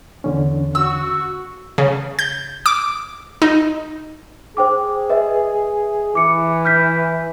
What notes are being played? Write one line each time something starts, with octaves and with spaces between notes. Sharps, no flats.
E2 D3 C#4
F#4 E6
C#3
G6
D6
D#4
G#4 C5 G5 D6
B4 D#5 E5
E3 D6 C#7
F6 G6 B6